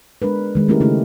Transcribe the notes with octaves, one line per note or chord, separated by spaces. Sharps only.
G#3 D4 A#4 B4
D#3 G#3
A3 A#3 C#4 E4 G4 A#4
C#3 A3 D#4 E4 G4